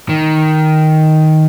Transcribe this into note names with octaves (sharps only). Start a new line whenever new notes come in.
D#3